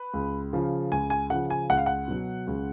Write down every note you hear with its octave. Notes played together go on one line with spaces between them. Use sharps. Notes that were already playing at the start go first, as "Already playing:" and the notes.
Already playing: B4
C#2
C#3 F3
C#2 G#5
G#5
C#3 F3 F#5
G#5
C#2 F#5
F5
F#5
B2 F#3
C#2